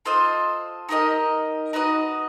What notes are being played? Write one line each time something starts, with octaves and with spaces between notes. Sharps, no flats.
F4 A4 C5 D#5
D#4 G4 A#4 D#5
D#4 F#4 B4 D#5